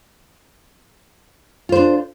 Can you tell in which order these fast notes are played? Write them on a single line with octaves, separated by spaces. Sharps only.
F4 C5 D4